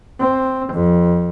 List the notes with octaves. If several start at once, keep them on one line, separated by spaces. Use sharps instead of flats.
C4
F2